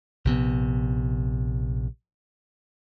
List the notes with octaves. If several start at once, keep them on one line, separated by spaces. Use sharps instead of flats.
A#1 C3 B3